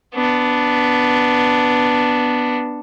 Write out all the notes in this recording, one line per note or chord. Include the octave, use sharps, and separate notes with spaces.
B3 D4